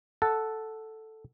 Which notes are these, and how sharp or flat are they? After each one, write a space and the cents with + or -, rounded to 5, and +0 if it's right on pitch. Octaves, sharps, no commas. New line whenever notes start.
A4 +0 F#5 +0 A5 +0